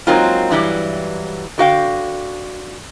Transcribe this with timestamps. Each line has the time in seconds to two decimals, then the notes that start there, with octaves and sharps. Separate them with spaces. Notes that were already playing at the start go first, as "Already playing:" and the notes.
0.07 F#3 G#3 A#3 C4 D#4 F4
0.51 G2 E3 F#3 G3
1.58 D3 F#4 F5 G5